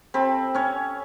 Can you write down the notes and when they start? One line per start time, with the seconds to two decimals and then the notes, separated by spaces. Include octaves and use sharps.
0.14 C4 A4 B5
0.55 C#4 C#5